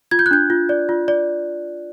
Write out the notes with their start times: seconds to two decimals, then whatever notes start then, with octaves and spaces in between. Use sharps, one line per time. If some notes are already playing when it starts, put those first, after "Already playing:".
0.11 F4 G#6
0.19 G6
0.26 F#6
0.31 D4 G6
0.50 F4
0.69 D5
0.89 F4
1.08 D5